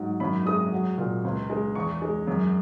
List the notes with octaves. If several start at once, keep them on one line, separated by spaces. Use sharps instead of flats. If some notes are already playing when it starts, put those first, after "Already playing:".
Already playing: G#2 F#3
F#2 B5
G#3 D#6
F#3
A#2
C#2
G#3
E2 C#6
G#3
F#2